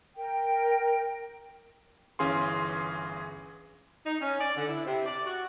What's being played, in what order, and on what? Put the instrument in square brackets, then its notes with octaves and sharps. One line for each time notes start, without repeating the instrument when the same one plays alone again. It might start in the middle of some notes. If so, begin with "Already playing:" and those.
[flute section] A#4 G5
[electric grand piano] G1 E3 C#4 G#4 F5 C6
[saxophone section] D#4
C#4
D5
D3
E4
C3
D5
F#4